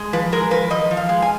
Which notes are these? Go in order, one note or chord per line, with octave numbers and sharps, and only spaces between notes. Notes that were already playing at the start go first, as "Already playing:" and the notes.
Already playing: G#3
F3 B4
G#3 A#4
F3 B4
F3 D#5
F3
F5
G#3
G#5